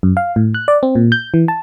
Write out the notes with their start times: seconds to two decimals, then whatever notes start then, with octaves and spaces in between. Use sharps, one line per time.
0.03 F#2
0.17 F5
0.36 A2
0.54 F#6
0.68 D5
0.83 C4
0.95 A#2
1.12 G6
1.34 E3
1.48 A5